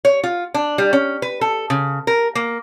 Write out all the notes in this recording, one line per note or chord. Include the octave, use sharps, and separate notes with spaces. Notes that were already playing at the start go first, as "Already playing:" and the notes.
C#5
F4
D4
G3
C#4
B4
A4
C#3
A#4
A#3